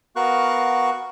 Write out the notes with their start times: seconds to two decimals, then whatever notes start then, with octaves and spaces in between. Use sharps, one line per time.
0.16 B3 F#4 A#4 F5 C#6 F#6